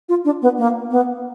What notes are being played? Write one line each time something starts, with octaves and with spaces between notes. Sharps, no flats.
F4
D4
B3
A#3
B3